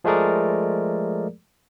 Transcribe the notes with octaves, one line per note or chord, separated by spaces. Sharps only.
F3 G#3 A3 G#4 A#4 D5